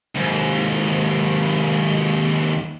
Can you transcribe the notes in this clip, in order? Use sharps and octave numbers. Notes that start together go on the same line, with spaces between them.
D#2 G#2